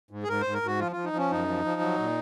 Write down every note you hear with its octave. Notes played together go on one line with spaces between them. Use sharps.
G#2
G#4
G#2 A#4
C5
G#2
A#4
G#2 F#4
F3 F4
F3 F4
D#4
F3
C#4
F#2 D#4
F3
F3
F#3
A#2